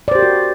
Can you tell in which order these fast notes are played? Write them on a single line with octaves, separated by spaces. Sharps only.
D5 C5 G4 A#4 F#4